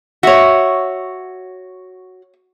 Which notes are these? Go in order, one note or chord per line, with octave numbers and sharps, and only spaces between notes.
F#4 C#5 E5